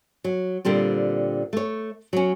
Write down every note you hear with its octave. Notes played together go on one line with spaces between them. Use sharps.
F#3
A#2 D3 G3 C4
A3 C#5
F#3 C#4